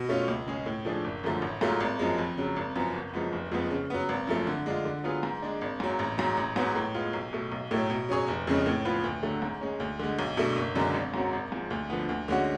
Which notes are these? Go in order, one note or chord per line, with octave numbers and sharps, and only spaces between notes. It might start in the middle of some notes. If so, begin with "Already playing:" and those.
Already playing: B2
A3 C#4 F4
C#2
C#3 G#3 C#4 G#4
A2
F3 A3 D4 G#4
F#1
F#2 D3 F3 A3
A1
G#2 F#3 A3 F4
G#1
F#2 F3 G#3
F2
C#3 F#3
G#1
F#2 F3 B3
F#1
F#2 F3 G#3 B3
F1
F2 F3 G#3 B3
C#3
F#3 B3
G#1
F#2 F3 A3
D3
G#3 D4 F4
D3
F#3 B3 F4 G#4
G#2
G#3 D4
G#1
G#2 F#3
A1
G#2 F#3
A1
G#2 F#3 B3
A2
G#3 B3 F4
B1
B2 A3
B1
A2 F#3 A3
B2
F#3 C#4 G#4 C#5
F1
F2 C#3 G#3 C#4
A2
F3 B3 F4 B4
D2
D3 F#3 A3
G#2
G#3 C#4
D2
D3 G#3
B1
B2 A3 D4
F#1
F#2 D3 G#3 D4
G#1
G#2 F#3 C#4 F#4
G#1
G#2 F3
D2
D3 F3 B3
D2
D3 G#3 C#4 F#4